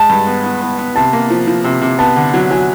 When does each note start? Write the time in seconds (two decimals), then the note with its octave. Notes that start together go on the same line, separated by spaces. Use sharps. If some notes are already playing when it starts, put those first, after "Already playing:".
Already playing: G#3 A5
0.10 G2
0.27 B3
0.44 B3
0.61 B3
0.79 B3
0.96 C3 A5
1.13 A#3
1.30 F3
1.47 F3
1.64 C3
1.82 C3
1.99 B3 A5
2.16 D3
2.34 F#3
2.51 F#3 G#5